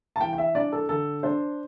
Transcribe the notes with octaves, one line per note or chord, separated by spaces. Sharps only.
A5
E3 G5
G5
E5
D4 D5
A4
D3 A4
D4 C5